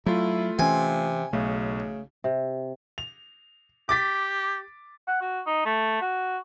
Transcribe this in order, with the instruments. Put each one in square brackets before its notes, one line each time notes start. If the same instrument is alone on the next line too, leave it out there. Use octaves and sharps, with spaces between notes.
[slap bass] F#3 [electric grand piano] A3 F4 [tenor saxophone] E4
[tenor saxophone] C3 [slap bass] E3 C#4 [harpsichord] G#5
[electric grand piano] B1 [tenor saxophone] C#3 [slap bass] A3
[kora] C3
[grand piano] F7
[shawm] G4 [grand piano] D6 A6 B6
[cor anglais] F#5
F#4
D#4
A3
F#4